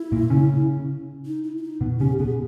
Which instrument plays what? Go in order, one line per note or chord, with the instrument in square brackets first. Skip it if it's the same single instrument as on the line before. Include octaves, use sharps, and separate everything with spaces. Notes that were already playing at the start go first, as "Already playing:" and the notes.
Already playing: [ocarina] E4
[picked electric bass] A#2 A#3
C#3 C#4
[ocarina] D#4
E4
E4
D#4
[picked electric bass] B2 B3
[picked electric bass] C#3 C#4 [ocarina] G4
[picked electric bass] B2 B3 [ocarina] G#4